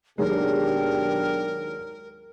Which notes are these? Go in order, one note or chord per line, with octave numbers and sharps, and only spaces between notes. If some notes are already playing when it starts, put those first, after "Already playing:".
D#2 B2 F#3 G#3 D4 G4 A#4